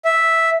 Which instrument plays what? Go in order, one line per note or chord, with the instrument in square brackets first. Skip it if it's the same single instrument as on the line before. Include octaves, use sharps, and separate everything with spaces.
[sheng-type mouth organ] E5